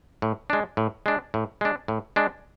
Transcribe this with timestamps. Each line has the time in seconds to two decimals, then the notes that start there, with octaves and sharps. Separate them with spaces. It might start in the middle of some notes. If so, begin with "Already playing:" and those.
0.22 A2
0.50 G#3 D4
0.77 A2
1.06 G#3 D4
1.34 A2
1.61 G#3 D4
1.88 A2
2.16 G#3 D4